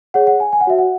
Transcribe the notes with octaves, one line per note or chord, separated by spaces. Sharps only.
G#4 C#5 F#5
F#5
G#5
G#5
F#5
F#4 C#5 E5
F#5